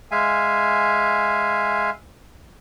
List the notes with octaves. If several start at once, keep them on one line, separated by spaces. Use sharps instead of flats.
G#3 E5 F5 G#5